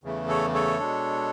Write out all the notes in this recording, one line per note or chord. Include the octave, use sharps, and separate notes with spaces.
E2 C#3 E3 A3
A4 C#5
A4 C#5
B2 G#3 D4